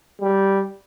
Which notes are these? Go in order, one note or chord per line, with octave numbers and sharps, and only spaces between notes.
G3